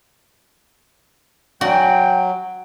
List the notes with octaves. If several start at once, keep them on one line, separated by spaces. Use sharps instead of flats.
F#3 F#4 D5 G5 G#5